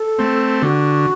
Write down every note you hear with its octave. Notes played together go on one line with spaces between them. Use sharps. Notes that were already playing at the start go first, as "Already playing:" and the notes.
Already playing: A4
A3 C4
D3 F#4